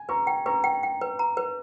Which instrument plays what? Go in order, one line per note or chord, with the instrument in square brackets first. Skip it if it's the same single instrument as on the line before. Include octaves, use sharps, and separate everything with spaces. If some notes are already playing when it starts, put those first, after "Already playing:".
Already playing: [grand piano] G#5
[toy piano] B4 [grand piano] A#5 C#6
[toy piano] G5
[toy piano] B4 [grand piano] A#5 C#6
[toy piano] G5
G5
B4
A#5
B4